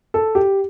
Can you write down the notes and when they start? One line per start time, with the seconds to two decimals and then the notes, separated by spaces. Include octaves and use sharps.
0.14 A4
0.35 G4